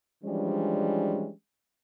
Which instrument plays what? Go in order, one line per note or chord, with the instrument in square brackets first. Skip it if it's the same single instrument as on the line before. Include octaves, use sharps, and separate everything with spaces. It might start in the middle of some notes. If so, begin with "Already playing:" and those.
[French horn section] E3 F3 G3 G#3 C#4 D4